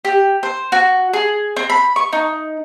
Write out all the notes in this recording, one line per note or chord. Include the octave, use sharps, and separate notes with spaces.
G4
C5
F#4
G#4
C4
B5
C#6
D#4